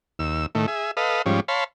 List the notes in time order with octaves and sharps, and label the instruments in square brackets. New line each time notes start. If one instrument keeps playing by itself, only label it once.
[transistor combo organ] D#2 E6
A2 D#3 A3
G#4 E5
A4 B4 D#5 F5
G#2 F3 G3 C#4
C#5 F5 A5 B5 C6